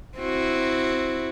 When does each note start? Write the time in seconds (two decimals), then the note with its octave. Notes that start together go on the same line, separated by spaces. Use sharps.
0.18 C4 E4 F#4